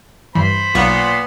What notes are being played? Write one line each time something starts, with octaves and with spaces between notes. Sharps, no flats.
G2 E3 C5 B5
B1 A#2 B3 F4 C#6